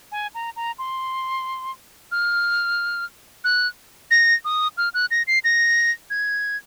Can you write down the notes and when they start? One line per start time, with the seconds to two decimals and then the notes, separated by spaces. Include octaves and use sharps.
0.12 G#5
0.35 A#5
0.56 A#5
0.78 C6
2.12 F6
3.44 F#6
4.11 A#6
4.45 D#6
4.78 F6
4.94 F#6
5.11 A#6
5.27 C7
5.44 A#6
6.10 G#6